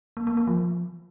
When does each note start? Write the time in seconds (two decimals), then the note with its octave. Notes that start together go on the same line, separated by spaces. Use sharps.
0.17 A#3
0.27 A#3
0.37 A#3
0.47 F3